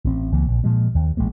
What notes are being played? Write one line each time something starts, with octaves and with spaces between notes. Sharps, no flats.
A1 C4
C#2 E3 A#3
A#1
A#2 F3 G#3
D#2
A1 G#3 A#3